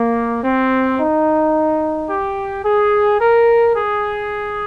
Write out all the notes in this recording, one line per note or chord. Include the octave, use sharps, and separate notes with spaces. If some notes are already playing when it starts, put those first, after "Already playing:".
Already playing: A#3
C4
D#4
G4
G#4
A#4
G#4